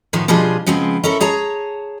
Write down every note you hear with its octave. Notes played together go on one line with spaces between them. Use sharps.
A2 D#3 F3 B3
B2 F3 G3 D4 G#4 C5
C#3 F3 G#3 B3 C4
C#4 E4 A4 A#4
G#4 C#5 A5 A#5